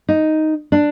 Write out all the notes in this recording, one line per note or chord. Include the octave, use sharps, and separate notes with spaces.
D#4
D4